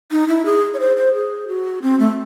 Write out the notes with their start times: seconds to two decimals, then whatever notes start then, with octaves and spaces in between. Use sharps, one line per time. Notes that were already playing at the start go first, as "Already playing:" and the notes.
0.11 D#4
0.29 E4
0.46 G#4
0.74 C#5
0.80 C5
0.97 C5
1.14 G#4
1.48 F#4
1.82 C4
2.00 A3